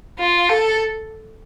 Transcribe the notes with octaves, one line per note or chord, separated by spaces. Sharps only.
F4
A4